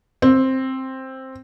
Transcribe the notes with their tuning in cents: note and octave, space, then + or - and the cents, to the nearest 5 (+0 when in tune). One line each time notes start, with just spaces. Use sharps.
C4 +10